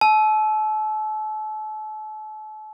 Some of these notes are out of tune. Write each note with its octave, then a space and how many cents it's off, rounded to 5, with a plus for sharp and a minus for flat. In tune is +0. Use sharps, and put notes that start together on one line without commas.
A5 -40 E6 +0